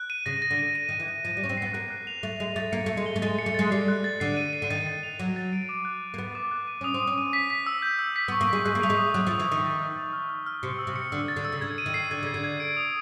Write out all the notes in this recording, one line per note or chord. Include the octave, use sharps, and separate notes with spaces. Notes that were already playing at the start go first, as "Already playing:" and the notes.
Already playing: F#6
D#7
C#3 A#6
A#6
D3
D#7
D#7
D#3 D#7
E3
D#7
F3 D#7
G3
C#4 D#7
C4
B3 C7
A#3 F#6
F#6
F7
A3 F#6
G#3 F7
A3 A6
A#3 C#7
A3 C#7
G#3
G7
A3
G#3 A6
C#7
A3
G#3 A6
G3 C7
F#6
A6
D3 C7
D#7
D#7
D3
D#3 A6
A6
F7
F#3 F7
A6
D7
D6
F#6
D7
A#3
B3 F#6
D6
F#6
D#7
C#4 D#6
C4
D#7
C#4
D#7
B6
B6
E6
G6
E6
B6
B3
C#6
A#3
G#3 B6
G#3 F#6
A#3
A3 D#6
G#3
D#6
F#3 F#6
F3
D#6
E3
D#3 D#6
A6
F6
A6
F6
F6
F6
C3 C#7
E6
C3
C#7
D3 E6
A6
D3
E6
C#3
D3 G#6
D#7
D#3
C7
D3 G#6
C#3 G#6
D3
G#6
D7
D#6